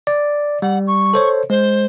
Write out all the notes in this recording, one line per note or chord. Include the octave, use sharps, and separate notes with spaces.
D5
G3 F#5
C#6
A4 C5 C#5
G#3 C5